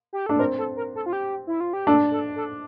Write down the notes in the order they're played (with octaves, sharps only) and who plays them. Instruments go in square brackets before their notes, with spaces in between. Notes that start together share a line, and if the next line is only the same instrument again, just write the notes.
[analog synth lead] G4
[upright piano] D4 [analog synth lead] A4
[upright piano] C4 [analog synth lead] A#4
[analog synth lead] A4
A#4
A4
F4
G4
E4
F4
G4
[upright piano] D4 [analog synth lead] A4
[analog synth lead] A4
A4